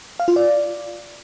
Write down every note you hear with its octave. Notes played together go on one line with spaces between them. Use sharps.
F5
F4
D5